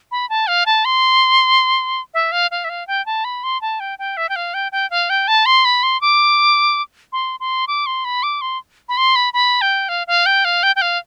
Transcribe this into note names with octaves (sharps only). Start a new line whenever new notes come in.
B5
A5
F5
A5
C6
E5
F5
F5
E5
F5
G5
A5
B5
C6
A5
G5
G5
E5
G5
F5
G5
G5
F5
G5
A5
C6
B5
C6
D6
C6
C6
D6
C6
B5
D6
C6
B5
C6
B5
B5
G5
F5
F5
G5
F5
G5
G5
F5